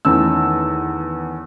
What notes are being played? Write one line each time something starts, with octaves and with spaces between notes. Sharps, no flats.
E2 D#3 A3 C#4 E6